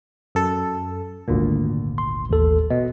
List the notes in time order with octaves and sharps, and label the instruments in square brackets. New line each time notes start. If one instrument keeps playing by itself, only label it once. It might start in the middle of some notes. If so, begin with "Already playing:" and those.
[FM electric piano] F#2 A4
G#1 D2 A#2
[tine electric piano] C6
A1 D#2 A4
[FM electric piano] B2 [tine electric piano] D#5